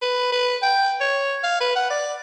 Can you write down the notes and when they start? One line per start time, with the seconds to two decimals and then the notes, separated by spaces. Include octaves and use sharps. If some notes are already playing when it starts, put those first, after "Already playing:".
0.02 B4
0.32 B4
0.62 G5
1.01 C#5
1.44 F5
1.61 B4
1.76 F#5
1.91 D5